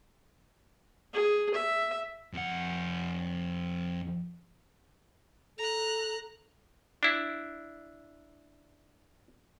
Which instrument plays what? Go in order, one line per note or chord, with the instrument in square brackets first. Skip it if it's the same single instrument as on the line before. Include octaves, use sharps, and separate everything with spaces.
[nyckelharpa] G#4
E5
[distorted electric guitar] F2 F#5
[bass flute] A4 [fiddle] A#5 F#6
[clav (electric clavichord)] D4 E4